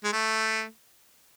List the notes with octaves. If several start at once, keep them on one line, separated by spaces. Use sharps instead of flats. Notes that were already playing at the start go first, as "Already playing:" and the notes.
G#3
A3